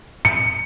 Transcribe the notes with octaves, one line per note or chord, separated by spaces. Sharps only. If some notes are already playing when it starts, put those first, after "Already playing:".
C#7